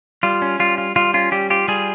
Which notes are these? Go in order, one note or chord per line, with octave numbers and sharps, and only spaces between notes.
G3 F4
C#4
G3 F4
F4
G3 F4
C#4 F4
G3 G4
F4 G4
G3 G#4